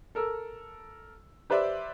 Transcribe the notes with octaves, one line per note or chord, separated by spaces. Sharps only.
A4 A#4 E6
G4 B4 C5 D5 E5